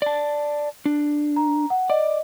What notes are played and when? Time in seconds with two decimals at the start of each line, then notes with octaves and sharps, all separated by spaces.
0.02 D5 A5
0.85 D4
1.36 A#5
1.70 F#5
1.90 D5 D#5